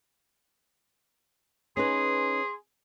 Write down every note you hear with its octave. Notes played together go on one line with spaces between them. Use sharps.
C#4 D#4 G#4 B4 C6